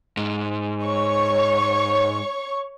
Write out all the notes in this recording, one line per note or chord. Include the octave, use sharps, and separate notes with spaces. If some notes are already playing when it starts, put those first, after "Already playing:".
G#2
C#5 C#6